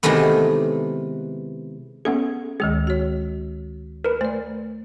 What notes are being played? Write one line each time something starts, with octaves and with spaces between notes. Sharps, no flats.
C3 D#3 E3 G#3 A3 B3
B3 C#4 G#4 A4 E5
D2 D#3 G#3 G#4
F#4 C#5
A#4 B4
A3 C5 D5